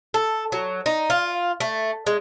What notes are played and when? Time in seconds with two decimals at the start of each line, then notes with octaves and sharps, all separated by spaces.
0.14 A4
0.52 F#3
0.86 D#4
1.10 F4
1.60 A3
2.07 G#3